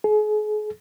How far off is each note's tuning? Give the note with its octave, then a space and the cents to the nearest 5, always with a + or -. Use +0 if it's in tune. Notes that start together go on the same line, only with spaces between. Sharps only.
G#4 +40